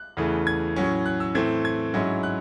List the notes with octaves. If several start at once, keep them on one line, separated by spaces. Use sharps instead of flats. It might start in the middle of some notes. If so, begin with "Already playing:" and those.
Already playing: F#6
E2 C#3 E3 A3
G#6
A2 F#3 C#4
F#6
E6
A2 E3 A3 C4 G#6
G#6
G#2 F#3 C#4 E4
F#6